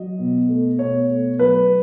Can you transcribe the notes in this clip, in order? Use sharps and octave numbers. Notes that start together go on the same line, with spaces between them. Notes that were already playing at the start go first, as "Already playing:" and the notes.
Already playing: F#3 D#5
B2
A3
B2 C#5
A3
F#3 B4